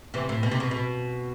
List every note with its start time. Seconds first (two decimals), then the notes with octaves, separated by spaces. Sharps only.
0.14 C3 E3
0.29 A2
0.43 B2
0.51 C3
0.60 B2
0.71 B2